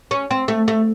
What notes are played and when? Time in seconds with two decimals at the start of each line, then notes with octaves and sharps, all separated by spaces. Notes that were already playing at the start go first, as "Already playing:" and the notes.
0.11 C#4
0.31 C4
0.48 A3
0.68 A3